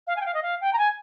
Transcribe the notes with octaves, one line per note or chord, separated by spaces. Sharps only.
F5
G#5
G5
F5
D#5
F5
G5
A#5
G#5